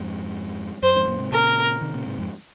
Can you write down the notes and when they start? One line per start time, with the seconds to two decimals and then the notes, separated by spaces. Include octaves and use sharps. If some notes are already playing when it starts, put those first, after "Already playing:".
Already playing: F2 G#2
0.83 F#2 C5
0.95 F2 G#2
1.07 F#2 A#2
1.19 G#2 C3
1.32 A#2 C#3 A#4
1.81 C3 D#3
1.94 A#2 C#3
2.06 G#2 C3
2.18 F2 G#2